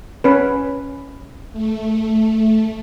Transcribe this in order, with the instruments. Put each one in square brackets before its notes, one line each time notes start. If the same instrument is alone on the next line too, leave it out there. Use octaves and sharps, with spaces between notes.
[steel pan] C#4 B4
[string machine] A3